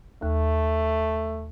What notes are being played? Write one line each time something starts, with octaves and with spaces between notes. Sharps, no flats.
D#2 A3